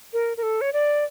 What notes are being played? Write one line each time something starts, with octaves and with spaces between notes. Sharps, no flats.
A#4
A#4
A4
C#5
D5